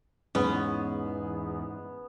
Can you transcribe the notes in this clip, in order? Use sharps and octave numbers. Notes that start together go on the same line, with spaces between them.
E2 G#2 B3 C#4 G#4